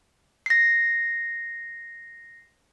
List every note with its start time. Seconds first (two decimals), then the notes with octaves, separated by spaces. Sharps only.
0.46 A#6 C7